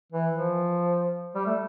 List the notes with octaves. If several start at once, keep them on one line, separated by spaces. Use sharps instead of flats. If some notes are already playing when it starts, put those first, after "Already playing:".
E3
F3
G3
A3